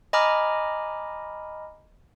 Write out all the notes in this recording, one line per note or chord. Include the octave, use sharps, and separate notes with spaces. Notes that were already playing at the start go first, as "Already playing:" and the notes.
D#5 G#5 A#5 B5 D6 F6